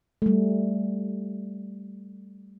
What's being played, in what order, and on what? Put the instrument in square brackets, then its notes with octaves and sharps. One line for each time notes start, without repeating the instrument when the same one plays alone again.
[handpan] G3 A3